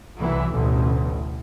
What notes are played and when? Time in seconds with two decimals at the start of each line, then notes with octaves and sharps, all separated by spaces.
0.19 C2 E3 F#3
0.51 A1 D2 B2